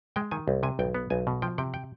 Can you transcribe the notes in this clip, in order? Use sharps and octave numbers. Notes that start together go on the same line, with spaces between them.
G#3 G5
D#3 G#5
C2
C3 G#5
B1 G5
B3
B1 G#5
B2
F3 G5
C3 G5
G5